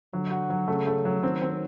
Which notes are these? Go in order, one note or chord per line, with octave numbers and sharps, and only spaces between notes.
D3 F#3
F#4
F#3
C#3 A3
A3
F#3
D#3 C4
C4